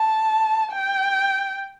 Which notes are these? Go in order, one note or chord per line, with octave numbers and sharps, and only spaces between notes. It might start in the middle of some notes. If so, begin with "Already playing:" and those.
Already playing: A5
G5